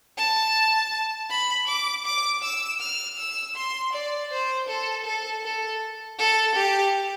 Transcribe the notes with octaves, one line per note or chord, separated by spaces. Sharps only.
A5
B5
D6
D6
E6
F6
E6
C6
D5
C5
A4
A4
A4
A4
G4